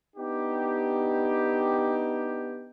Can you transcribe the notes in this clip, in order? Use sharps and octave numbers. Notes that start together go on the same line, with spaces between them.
B3 D4 D#4 G4